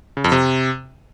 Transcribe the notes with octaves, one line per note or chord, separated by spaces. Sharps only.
C#3
F2
C3